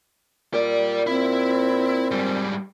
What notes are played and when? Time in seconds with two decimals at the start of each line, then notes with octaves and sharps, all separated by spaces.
0.54 A#2 G4 D5
1.07 C4 E4
2.11 G#2 G3